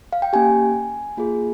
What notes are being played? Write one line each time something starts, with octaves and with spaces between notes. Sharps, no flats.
F5
G5
A#3 C#4 G4 G#5
A#3 F4 G#4